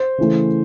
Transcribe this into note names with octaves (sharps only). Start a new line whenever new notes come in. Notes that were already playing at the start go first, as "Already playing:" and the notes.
Already playing: C5
C#3 E3 A3